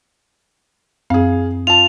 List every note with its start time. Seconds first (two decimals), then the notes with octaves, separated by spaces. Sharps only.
1.10 F#2 C4 G#4 F5
1.67 F4 A5 F7